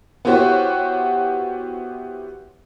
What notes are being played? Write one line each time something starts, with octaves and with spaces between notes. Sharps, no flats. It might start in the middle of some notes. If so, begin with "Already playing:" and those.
B3 E4 F#4 G4 C5 C#5